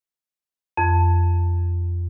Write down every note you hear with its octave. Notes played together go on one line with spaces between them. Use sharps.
F2